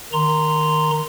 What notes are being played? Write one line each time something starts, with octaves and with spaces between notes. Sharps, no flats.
D#3 A#5 C6